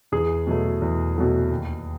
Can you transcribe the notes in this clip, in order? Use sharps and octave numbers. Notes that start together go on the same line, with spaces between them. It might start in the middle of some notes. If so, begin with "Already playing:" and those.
E2 G#4
B2 F#3 A3
E2
B2 F#3 A3
D#2